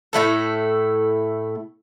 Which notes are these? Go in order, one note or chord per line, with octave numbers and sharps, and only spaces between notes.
A2 A3 E4 A4